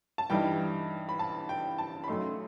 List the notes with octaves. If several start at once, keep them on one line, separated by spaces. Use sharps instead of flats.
A5
G2 E3 G3 D#4 G5
B5
A5
G5
A5
B5
F#2 F#3 A3 D#4 C6